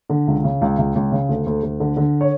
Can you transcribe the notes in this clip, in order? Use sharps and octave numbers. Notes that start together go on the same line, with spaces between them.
D3
C#2
C#3
C#2
C#2
C#2
C#3
D2
D2
D2
D3
D3
C#5